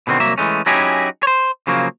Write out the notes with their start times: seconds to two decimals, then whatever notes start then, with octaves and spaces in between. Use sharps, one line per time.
0.07 B2 D3 D#3 C4
0.20 C2 F#3 A#3 E5
0.38 E3 G#3 A3 C#4
0.66 F#3 C#4 D#4 E4 G4 G#4
1.23 C5 C#5
1.67 C#3 F3 F#3 A#3